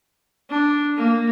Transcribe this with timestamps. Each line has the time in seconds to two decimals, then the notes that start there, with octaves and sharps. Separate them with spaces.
0.50 D4
0.97 A#3